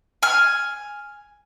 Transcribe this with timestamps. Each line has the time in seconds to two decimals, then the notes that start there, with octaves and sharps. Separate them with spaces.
0.23 G#5 F6